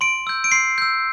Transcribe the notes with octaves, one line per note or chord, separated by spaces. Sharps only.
C6 D7
E6 G6
D7
C6 C7
E6 G6